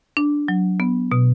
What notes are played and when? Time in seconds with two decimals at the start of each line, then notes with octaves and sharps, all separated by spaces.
0.17 D4
0.48 F#3
0.80 B3
1.12 B2